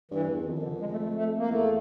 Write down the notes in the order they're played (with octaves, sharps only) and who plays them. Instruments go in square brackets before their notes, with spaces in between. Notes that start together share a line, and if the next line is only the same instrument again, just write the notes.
[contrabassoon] G2 [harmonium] E3
[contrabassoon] E2
[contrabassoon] F2 [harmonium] D#3
[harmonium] D#3
D3
G#3
A3
A3
A3
A#3
[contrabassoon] E2 [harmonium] A3